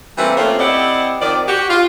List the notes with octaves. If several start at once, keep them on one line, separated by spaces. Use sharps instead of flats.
E3 G3 A3 A#3 C4 E4
A3 A#3 C4 C#4 F4
C4 E4 G4 D5 D#5 F#5
D#3 F3 C4 D5
F#4 G4
F4